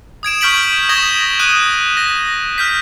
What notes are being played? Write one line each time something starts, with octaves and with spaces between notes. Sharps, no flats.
D#6 G#6 D7 E7
C#6 F6 G6 B6 D7 F#7
C#6 D#6 G#6 A#6 E7 G7
D#6 F#6 D#7
A#6
F6 G6 B6